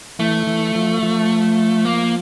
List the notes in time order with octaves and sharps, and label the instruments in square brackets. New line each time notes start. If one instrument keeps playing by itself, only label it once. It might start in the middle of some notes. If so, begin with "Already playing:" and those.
[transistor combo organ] E3 [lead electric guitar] A3
[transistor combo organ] E3
F3
F3
[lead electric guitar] A#3